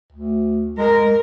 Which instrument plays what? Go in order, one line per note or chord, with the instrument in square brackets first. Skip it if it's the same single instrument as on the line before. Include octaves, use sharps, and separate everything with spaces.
[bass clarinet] D2
[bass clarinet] G#3 [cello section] A#4